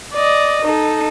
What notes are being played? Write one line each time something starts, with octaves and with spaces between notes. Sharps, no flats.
D5 D#5
D#4 A4